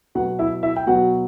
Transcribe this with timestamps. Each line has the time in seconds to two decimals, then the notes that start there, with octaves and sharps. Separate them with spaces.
0.15 B2 F#3 B3 F#4 F#5
0.39 E4 E5
0.63 E4 E5
0.76 G5
0.87 B2 F#3 B3 F#4 F#5